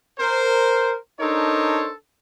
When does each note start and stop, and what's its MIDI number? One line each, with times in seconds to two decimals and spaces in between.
0.19 0.94 70
0.19 0.94 72
1.20 1.90 62
1.20 1.90 63
1.20 1.90 69
1.20 1.90 70
1.20 1.90 72
1.20 1.90 73